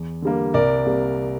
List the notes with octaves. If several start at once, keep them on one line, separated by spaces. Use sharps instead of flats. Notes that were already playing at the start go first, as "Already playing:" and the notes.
Already playing: E2
D3 G3 A#3
C2 A#4 D5
C3 G3 A#3